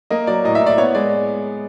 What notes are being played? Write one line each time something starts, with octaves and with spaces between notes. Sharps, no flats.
A#3 D#5
F#3 D5
A2 D#5
E5
A2
D5
B3 C#5
G#3 D5